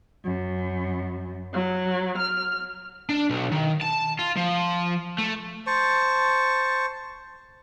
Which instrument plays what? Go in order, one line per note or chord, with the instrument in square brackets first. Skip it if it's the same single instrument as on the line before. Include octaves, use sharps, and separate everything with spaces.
[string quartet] F#2
F#3
F6
[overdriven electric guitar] D4
B1
D#3
A5
F4
F3
A3
[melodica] C5 A5 C#6